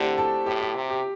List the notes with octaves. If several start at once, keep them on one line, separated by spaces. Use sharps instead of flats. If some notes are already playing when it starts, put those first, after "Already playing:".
Already playing: D3 A3 C4 D4 E4 G4
A4
A2 G4
G4
C3
G4